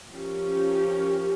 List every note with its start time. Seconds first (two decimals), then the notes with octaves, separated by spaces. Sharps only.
0.11 F3 C#4 G4 A#4